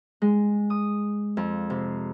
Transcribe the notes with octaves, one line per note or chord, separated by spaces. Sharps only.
G#3
D#6
F2
C3